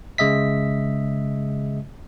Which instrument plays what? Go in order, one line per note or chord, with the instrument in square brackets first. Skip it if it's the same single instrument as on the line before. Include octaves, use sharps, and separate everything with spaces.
[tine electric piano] C#3 G#3 D#5 E5 B6